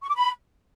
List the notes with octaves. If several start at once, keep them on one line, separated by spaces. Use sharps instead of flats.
C#6
D6
B5